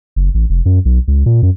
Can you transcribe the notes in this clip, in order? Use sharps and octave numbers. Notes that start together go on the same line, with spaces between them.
F#1
A1
F1
F#2
B1
C#2
A#2
F#2